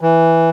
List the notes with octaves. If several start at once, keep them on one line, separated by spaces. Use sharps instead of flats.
E3